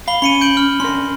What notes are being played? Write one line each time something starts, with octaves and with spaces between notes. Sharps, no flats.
F5 B5 G7
C#4 B5 C#7 D#7
G6 D7 F#7
F6
C#4 D4 A#4 C6